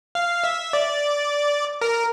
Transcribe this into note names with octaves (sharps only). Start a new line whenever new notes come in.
F5
E5
D5
A#4